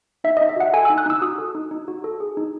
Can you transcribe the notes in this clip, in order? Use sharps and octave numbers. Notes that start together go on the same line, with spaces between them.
D#4 E5
D#4 D#5
E5
F#4 F#5
A4 G#5
D#4 E6
F#6
D#4 E6
F#4 D#6
A4
D#4
D#4
F#4
A4
G#4
D#4